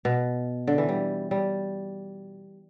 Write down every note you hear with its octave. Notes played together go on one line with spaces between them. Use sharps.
B2
D3
E3
G3
G3